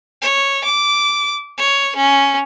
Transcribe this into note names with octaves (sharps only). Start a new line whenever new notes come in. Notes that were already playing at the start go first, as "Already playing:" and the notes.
C#5
D6
C#5
C#4